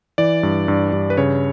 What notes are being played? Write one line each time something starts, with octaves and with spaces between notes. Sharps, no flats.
E3 D5
G2
G2
G2
B4
C#3 C#5